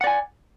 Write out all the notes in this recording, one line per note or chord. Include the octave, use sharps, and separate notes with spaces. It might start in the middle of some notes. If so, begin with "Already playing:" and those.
D5 F#5 G#5